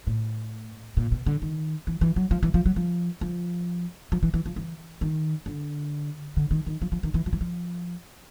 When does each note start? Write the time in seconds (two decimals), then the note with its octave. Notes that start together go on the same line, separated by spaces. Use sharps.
0.07 A2
0.97 A#2
1.12 B2
1.26 D3
1.42 D#3
1.87 E3
2.01 E3
2.16 F#3
2.31 F3
2.43 E3
2.54 F3
2.66 F#3
2.76 F3
3.21 F3
4.12 F3
4.23 E3
4.34 E3
4.46 F3
4.56 E3
5.01 D#3
5.46 D3
6.37 D3
6.51 D#3
6.66 D#3
6.82 F3
6.92 F3
7.03 D#3
7.14 E3
7.26 F3
7.33 E3
7.41 F3